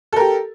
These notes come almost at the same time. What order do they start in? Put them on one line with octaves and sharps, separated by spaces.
A4 A#4 G4